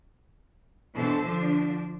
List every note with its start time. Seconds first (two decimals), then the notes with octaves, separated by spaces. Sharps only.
0.93 B2 E3 D4 A4 C5
1.23 D3 F3 D4